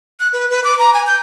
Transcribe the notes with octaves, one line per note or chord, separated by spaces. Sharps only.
F#6
B4
B4
D6
A#5
G#5
G6